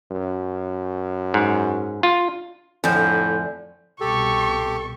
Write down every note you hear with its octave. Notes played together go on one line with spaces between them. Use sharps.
F#2
G#2
F4
F2 A2 D3 F3 G#5 G6
C2 B2 G4 A4 C#6